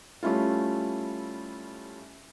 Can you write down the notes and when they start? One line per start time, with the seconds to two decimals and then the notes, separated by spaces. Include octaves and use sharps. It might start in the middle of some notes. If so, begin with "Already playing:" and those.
0.23 G3 A3 C#4 E4 F4